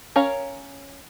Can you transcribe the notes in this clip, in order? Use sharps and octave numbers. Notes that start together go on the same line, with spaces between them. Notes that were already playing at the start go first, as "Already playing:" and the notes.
C#4 A#4 C#5 F5 A#5